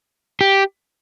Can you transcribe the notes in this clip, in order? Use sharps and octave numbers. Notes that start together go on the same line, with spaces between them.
G4